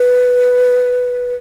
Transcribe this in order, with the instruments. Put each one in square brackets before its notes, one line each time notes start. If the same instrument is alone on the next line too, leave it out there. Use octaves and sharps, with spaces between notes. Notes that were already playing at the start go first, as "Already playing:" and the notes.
Already playing: [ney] B4